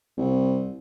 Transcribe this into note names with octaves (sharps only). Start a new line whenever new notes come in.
C2